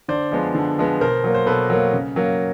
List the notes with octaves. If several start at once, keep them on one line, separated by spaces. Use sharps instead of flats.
D3 C5 D5
F3 G#3 B3
D3
F3 G#3 B3
B2 A#4 C5
F#3 A#3
C5
B2 A4 B4
F#3 A#3
C#3
F#3 A#3